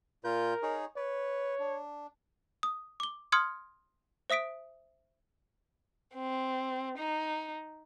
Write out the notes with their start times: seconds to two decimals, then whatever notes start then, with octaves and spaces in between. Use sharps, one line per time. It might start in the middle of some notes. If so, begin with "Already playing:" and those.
0.24 A#2 F4 A#4 G6
0.63 D#4 G#4 C#5
0.96 B4 C#5
1.59 D4
2.63 D#6
3.00 D6 G7
3.32 C6 D#6 F6 G#6 C#7
4.30 C5 E5 D#6 B6 D7
6.14 C4
6.98 D#4